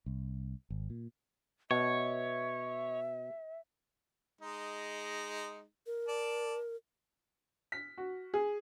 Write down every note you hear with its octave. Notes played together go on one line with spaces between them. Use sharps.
C2
G#1
A#2
B2 C#5 E5
G#3 D#4
A#4
D5 A5
B6
F#4
G#4